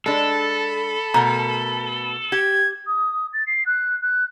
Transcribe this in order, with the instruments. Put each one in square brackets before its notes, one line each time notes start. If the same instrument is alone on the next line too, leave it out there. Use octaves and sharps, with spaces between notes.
[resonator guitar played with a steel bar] G#3 D4 [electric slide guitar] A4 [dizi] B5
[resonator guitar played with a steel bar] B2 A3 A#4 [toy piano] A#5
[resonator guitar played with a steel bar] G4 [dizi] G#6
[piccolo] D#6
A6
C7
F#6
F#6